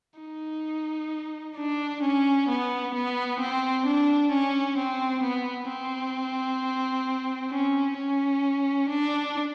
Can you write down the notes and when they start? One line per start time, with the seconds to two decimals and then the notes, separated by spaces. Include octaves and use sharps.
0.20 D#4
1.57 D4
2.03 C#4
2.49 B3
2.94 B3
3.40 C4
3.86 D4
4.32 C#4
4.78 C4
5.24 B3
5.69 C4
7.51 C#4
7.97 C#4
8.89 D4